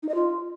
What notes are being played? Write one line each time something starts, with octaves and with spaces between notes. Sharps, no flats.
D#4
D#5
F4